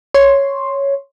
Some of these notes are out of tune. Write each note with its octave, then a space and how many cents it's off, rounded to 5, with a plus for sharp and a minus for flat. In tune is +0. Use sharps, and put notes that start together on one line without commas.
C#5 +0 C6 +5